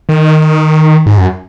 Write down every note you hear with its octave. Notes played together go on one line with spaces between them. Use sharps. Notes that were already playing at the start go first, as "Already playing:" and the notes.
D#3
G#2
F#2